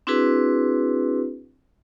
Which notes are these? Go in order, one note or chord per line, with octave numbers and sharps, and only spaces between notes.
C4 D4 E4 F#4 G#4 B4